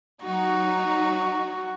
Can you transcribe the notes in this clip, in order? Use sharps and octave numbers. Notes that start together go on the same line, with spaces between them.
F#3 D#4 F#4